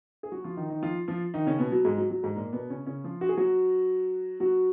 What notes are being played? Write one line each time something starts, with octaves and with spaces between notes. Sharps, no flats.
G#4
F#3 F#4
F3 F4
D#3 D#4
D#3 D#4
F3 F4
F3 F4
D#3 D#4
C#3 C#4
B2 B3
F#3
G#2 G#3
F#3
F#3
G#2 G#3
A#2 A#3
B2 B3
C#3 C#4
C#3 C#4
F3 F4
F#4
G#4
F#3 F#4
F#3 F#4